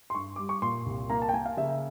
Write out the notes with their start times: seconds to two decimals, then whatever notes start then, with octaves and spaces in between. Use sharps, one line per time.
0.10 C6
0.15 G2 C#6
0.36 G3 D6
0.49 C#6
0.62 A#2 C6
0.86 C2
1.10 A#3 A#5
1.22 A5
1.29 G5
1.34 A#3 G#5
1.46 F5
1.57 C#3 E5